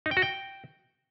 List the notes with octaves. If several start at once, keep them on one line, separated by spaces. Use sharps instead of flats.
D#4
G5
F#4
G5